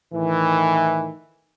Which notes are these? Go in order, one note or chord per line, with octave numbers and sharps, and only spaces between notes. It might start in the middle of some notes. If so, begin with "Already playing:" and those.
A2 D#3 E3